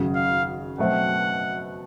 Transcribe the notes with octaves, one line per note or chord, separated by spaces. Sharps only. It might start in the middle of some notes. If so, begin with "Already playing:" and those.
Already playing: G#1 F#2 C#3
F5
B2 F#3 A3 C4 F#5